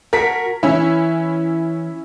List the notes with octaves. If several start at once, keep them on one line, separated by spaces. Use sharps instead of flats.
F#4 A#4 A5 B6
E3 C#4 E4